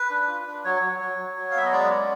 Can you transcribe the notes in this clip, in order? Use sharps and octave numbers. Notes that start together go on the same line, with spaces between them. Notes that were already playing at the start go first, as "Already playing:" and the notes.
Already playing: B4
D4
F4
D4
F#3 C#5
F#3
F#3
F#3
F#3
F5
B3 E5
D#5
G#3 D5
C#4